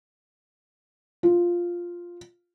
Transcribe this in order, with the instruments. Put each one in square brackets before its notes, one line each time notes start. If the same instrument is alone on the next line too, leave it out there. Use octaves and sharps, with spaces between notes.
[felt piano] F4